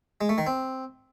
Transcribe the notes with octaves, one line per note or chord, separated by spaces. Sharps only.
G#3
A3
D#3
C4